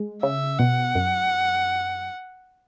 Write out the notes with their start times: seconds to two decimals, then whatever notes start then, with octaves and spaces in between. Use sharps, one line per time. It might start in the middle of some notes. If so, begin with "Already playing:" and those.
Already playing: G#3
0.23 C#3 E5
0.59 B2 F#5
0.95 F#2